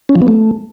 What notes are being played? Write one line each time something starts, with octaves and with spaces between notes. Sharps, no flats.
C#4
F3
B3
A3